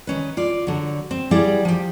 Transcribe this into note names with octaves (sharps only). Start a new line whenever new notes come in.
D#3 C#4 B4
F4 D5
D3 F#3
C4
F#3 G3 E4 G#4 D5
F3 G4